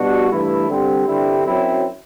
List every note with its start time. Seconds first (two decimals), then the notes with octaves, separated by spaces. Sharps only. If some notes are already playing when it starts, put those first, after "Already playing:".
Already playing: B2 G3 D4 F#4
0.29 G2 E3 A3 E4
0.69 D3 G3 C4
1.07 G2 D3 G3 C4 E4
1.45 F#2 F#3 C4 E4